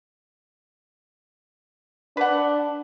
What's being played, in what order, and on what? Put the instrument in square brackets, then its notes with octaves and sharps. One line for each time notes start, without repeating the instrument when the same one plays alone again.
[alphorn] D4 [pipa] B4 F#5